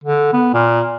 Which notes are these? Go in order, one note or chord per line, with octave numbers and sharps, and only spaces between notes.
D3
B3
A#2